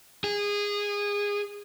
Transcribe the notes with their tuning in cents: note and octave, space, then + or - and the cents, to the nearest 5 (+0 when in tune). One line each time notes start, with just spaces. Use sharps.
G#4 -20